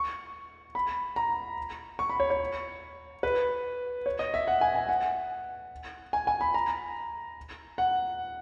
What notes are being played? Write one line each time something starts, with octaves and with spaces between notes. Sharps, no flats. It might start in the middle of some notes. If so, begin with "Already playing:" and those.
Already playing: C#6
B5
A#5
C#6
B5
C#5
C#5
B4
C#5
D#5
E5
F#5
G#5
G#5
F#5
G#5
G#5
B5
A#5
F#5